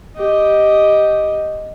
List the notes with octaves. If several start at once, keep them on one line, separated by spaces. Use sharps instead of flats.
G4 D#5